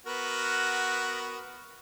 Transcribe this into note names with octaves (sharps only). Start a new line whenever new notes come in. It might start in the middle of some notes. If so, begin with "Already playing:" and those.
B3 F#4 A#4